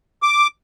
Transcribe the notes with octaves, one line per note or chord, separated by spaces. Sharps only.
D6